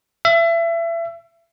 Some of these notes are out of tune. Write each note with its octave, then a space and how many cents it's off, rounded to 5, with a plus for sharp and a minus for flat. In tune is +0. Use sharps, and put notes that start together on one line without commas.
E5 +30